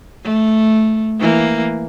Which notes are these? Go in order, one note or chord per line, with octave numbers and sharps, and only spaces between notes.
A3
E3 A#3